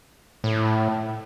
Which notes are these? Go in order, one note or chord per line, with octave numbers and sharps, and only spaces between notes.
A2